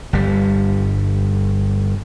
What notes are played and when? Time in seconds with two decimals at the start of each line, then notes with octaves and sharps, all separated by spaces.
0.13 G1 G3